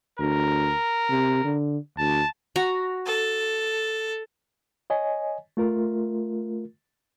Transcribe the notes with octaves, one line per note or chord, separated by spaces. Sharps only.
D2 A#4
C3
D3
D2 A5
F#4 A#5
A4
C#5 D#5 G#5
A3 F4 A#4